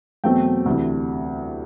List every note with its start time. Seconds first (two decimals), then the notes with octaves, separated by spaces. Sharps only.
0.24 E2 B2 F#3 A3 C4 G5
0.66 D2 C3 E3